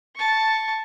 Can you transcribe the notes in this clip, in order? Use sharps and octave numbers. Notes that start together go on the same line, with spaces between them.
A5 C#6